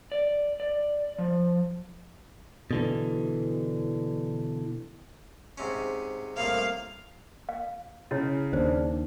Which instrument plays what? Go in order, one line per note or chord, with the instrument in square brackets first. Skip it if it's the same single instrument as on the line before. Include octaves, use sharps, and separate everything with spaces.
[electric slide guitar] D5
D5
F3
[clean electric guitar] B2 D3 E3
[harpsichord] G#2 C3 C#4
[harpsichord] C2 A2 A#3 [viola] F5
[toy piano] F5
[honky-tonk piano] C#3 [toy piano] E4 C#5
[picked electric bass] D#2 [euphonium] D4 [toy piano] C5